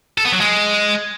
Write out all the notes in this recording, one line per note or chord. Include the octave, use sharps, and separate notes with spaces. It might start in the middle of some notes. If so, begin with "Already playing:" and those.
A4
B3
F#3
G#3